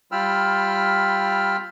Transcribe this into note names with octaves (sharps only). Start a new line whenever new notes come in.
G3 F4 G5 B5 E6 F6